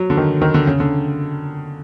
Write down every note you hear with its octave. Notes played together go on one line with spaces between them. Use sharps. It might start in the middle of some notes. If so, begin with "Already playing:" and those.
Already playing: F#3
D3
D#3
D#3
D3
C#3
D3